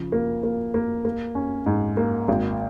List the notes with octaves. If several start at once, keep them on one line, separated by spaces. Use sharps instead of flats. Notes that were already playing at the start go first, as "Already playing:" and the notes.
Already playing: C#3 F3
A#3
A#3
A#3
A#3
C#4
G#2
A#3
G#1